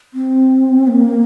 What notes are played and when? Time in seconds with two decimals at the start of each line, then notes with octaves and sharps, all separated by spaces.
0.14 C4
0.87 A#3